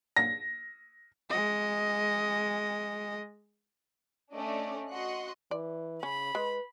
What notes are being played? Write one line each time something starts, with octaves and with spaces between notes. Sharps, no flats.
A#6
G#3 D#5
A3 C#4 D4 D5 D#5
F#4 D#5 C6 F#6 C#7
E3 D5
C#3 C#4 B5
G#3 B4